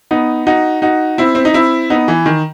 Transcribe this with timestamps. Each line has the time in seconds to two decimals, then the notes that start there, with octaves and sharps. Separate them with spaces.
0.11 B3 D#4
0.47 D#4 F#4
0.82 D#4 F#4
1.18 C4 E4
1.35 C4
1.45 D#4
1.54 C4 E4
1.90 B3 D#4
2.08 E3
2.26 D#3